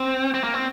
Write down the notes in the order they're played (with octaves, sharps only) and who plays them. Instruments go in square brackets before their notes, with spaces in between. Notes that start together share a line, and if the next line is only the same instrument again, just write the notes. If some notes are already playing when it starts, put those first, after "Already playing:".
Already playing: [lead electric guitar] C4
C4
A#3
C4